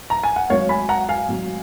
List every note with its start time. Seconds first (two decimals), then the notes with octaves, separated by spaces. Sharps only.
0.10 A#5
0.23 G#5
0.36 F#5
0.50 G#1 G#2 F#3 C#5 F5
0.69 G#5 B5
0.89 F#5 A#5
1.09 F5 G#5
1.28 G#1 G#2 F#3